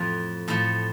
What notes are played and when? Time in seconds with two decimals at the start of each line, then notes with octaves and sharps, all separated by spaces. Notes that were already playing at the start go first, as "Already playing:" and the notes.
Already playing: F2 A2 F3
0.48 A2 F3 A4